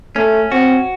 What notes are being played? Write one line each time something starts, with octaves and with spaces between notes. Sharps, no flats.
A3 C#4
C4 F#4